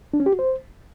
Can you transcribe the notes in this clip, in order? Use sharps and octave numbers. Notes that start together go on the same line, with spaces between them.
D4
C#4
G4
F#4
C5